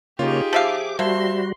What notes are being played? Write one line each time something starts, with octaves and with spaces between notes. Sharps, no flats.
C#3 A#3 D#4 F4 G4 G#4 C#5
F3 E5 F5 D6
G3 A#3 F#4 C5 E5 A5 C6